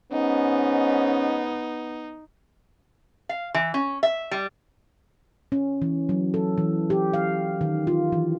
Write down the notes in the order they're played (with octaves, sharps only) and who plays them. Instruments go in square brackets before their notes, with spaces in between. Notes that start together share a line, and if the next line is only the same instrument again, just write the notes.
[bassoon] G#2 [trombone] B3 [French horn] C#4 [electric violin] D#4
[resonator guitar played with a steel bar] F5
E3
C#4
E5
G3
[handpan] C#4
E3
F#3
A4
E3
G4
F5
D#3
F4
E3